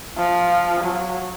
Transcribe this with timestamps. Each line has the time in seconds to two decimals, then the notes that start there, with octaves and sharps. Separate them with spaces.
0.18 F3
0.84 F#3